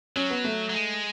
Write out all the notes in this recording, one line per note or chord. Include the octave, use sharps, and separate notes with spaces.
F#3 C#4
B3
A3
F#3
G#3